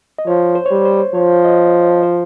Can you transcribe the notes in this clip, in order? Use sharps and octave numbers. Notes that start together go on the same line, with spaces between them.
D#5
F3 C#5
C5
C#5
G3 C5
C5
F3 C#5
D#5
C5